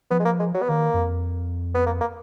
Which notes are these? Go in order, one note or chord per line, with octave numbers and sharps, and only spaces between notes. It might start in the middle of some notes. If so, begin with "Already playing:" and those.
F3 B3
G#3
A#3
G#3
F#3
B3
D#3 A#3
F#2
F2
B3
A#3
A#3